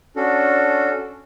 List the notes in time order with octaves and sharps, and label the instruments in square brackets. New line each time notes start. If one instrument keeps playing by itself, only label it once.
[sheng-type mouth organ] C#4 D4 F#4 A4